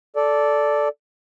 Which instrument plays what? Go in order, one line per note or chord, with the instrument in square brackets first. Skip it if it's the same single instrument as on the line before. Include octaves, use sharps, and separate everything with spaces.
[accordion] A4 D5